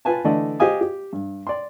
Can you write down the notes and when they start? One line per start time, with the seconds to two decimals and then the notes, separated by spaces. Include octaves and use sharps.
0.05 F4 B4 G#5 A5
0.24 D3 E3 A3 A4 D5 D#5
0.60 G4 C5 D#5 F5 G#5 D#6
0.81 G4
1.13 G2
1.47 D5 C6